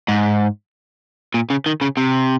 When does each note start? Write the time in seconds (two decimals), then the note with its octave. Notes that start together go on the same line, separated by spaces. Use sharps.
0.08 G#2
1.34 A#2
1.50 C#3
1.66 D#3
1.81 C#3
1.97 C3